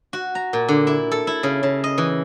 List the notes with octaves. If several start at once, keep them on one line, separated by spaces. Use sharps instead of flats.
F#4
A#5
A#2
D3
E4
A4
E4
C#3
C#3
D#5
E3